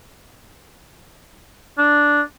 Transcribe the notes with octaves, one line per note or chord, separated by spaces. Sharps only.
D4